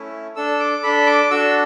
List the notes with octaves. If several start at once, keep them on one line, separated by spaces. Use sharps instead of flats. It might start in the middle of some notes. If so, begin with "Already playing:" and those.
Already playing: A3 C#4 E4
D4 A4 E6
D6
D4 A4 B5
D6
D4 F#4 A4 E6